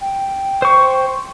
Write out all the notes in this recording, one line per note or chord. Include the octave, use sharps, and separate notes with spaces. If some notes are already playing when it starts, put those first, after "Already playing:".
G5
C5 G5 C#6